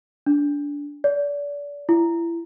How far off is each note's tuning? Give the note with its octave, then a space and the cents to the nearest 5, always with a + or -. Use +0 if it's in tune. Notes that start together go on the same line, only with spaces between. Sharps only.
D4 -20
D5 -30
E4 +30